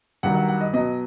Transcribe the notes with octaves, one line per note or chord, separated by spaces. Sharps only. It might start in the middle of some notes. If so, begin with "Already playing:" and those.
G2 D#3 F#3 F#5
F#5
F#5
D#5
B2 F#3 D#5